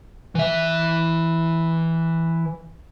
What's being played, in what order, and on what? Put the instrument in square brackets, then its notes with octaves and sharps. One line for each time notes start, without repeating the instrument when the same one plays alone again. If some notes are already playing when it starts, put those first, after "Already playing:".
[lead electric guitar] E3 E5